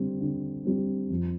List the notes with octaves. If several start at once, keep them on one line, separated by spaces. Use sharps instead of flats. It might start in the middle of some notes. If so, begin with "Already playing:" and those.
Already playing: D3 G3 C4
D3
G3 C4
F2